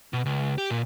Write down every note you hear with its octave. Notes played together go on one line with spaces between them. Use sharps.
B2
C#2
G4
A#2